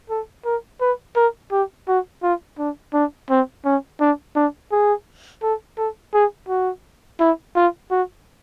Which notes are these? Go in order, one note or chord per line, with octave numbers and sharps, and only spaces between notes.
A4
A#4
B4
A#4
G4
F#4
F4
D4
D4
C4
C#4
D4
D4
G#4
A4
A4
G#4
F#4
E4
F4
F#4